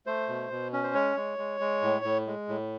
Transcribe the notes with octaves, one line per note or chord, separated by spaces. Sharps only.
A3 C5
B2
B2
C#4
C5
G#3 C#5
G#3
G#3
G#3
A2
A2
G#3
A2